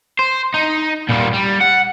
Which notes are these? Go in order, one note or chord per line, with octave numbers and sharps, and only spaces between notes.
C5
D#4
A#2 G3
G3
F#5